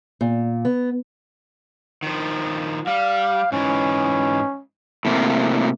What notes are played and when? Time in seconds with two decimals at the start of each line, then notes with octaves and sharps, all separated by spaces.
0.21 A#2
0.65 B3
2.03 D#3 F3
2.87 G3 F5
3.52 G#2 E3 C#4
5.05 A2 C3 A#3